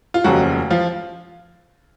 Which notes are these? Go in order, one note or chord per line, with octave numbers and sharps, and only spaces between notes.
F4
F1 D#2 C#3 F3 F#3 F#4
F3 F4